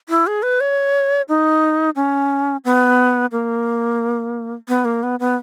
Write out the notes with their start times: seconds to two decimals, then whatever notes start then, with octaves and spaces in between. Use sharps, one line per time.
0.09 E4
0.27 G#4
0.43 B4
0.61 C#5
1.29 D#4
1.96 C#4
2.65 B3
3.32 A#3
4.68 B3
4.85 A#3
5.03 B3
5.20 B3